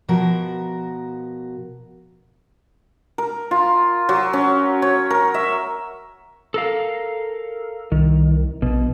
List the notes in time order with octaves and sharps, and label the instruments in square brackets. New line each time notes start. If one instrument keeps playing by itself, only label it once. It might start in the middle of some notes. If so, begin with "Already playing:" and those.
[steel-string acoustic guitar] B2 F3 F#4 A#4
[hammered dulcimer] A#4
F4
F#3
C#4
C#5
A#4
E5
[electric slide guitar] A4 A#4 F5
[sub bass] C2 [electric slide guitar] D#3
[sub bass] A#1 [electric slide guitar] B2